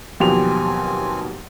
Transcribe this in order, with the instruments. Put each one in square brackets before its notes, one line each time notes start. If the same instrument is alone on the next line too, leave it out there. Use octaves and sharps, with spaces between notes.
[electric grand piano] D#2 B2 [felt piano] F3 F#3 [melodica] C4 G#5 [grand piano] G4 F7